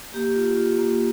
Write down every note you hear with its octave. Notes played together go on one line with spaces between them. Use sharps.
A#3 G4
F4
F4
A#3